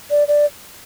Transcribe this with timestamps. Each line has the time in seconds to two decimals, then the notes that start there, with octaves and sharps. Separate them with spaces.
0.10 D5
0.28 D5